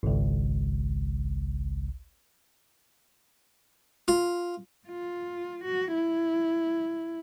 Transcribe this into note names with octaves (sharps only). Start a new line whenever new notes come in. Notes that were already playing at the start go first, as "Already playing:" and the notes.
G#1 C#2
F4
F4
F#4
E4